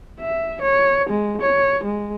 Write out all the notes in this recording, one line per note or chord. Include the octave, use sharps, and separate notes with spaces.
E5
C#5
G#3
C#5
G#3